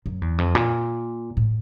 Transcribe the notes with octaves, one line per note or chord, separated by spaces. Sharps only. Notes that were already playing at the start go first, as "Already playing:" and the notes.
F#2
E2
F2
A#2
A2